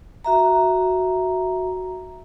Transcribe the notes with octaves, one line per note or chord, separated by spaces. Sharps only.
F#4 E5 A#5